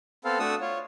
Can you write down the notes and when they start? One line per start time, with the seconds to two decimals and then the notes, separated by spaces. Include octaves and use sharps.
0.25 B3 C4 A4 F5
0.39 A3 D4 F#4 D#6 E6
0.61 F4 C#5